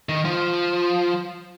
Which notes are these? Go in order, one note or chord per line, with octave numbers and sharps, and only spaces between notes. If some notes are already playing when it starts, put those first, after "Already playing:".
D#3
F3